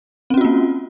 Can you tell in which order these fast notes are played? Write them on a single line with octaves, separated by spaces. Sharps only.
C4 C#4 F#4 F4 A#3